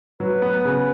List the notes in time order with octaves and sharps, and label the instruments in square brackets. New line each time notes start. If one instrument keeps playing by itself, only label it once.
[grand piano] F#3 [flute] B4
[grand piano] B3
C#3